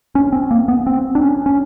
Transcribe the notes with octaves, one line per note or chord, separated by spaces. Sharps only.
C#4
C4
A#3
B3
C4
D4
C#4
C#4